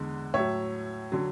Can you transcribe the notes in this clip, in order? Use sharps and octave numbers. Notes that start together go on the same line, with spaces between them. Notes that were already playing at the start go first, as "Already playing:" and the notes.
Already playing: E2 D3 G#3
A2 F#3 C#5 E5
D3 F#3